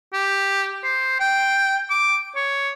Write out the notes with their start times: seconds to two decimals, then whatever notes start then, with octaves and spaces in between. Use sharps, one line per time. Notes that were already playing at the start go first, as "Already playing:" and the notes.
0.13 G4
0.84 C5
1.20 G5
1.90 D6
2.36 C#5